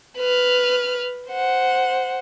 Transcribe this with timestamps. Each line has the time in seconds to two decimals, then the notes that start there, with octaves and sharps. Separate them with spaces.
0.18 B4 F6
1.30 C5 F#5